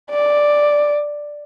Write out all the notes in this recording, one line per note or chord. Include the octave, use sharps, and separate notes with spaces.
D5